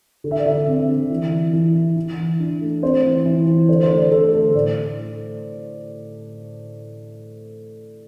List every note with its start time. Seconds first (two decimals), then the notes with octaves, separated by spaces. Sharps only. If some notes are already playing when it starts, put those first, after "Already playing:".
0.24 D3
0.31 E5
0.38 D5
0.46 D3 E5
0.67 C4
0.89 D3
1.10 E3
1.31 E3
1.53 E3
1.75 E3
1.96 E3
2.17 E3
2.39 D4
2.61 A3
2.83 C4 C5
3.04 E3
3.25 E3
3.47 E3
3.68 D3 C5
3.83 C5
3.90 A3
3.97 D5
4.11 D3 A4
4.33 A3 A4
4.55 A2 D5